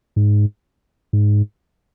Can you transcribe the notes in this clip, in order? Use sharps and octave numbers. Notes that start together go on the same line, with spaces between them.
G#2
G#2